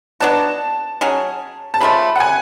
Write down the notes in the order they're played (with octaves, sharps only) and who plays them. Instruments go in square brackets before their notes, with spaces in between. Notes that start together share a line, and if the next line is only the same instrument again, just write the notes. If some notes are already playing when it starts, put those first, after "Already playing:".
[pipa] F#3 B3 D4 F#4 [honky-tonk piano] A5
[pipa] F#3 C#4 G#4
[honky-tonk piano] A5
[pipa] C#3 F3 A3 [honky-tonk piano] B5
[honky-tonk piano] F#5
G#5